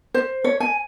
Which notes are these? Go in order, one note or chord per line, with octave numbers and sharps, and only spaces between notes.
C5
C#5
G#5